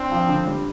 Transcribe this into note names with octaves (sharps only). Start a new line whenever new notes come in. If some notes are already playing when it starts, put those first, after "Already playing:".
Already playing: C4 D4
F3
D3
G3